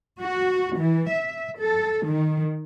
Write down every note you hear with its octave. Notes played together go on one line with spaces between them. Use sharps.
F#4
E3
E5
A4
D#3